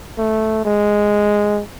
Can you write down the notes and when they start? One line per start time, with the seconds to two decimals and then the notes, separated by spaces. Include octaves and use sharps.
0.18 A3
0.65 G#3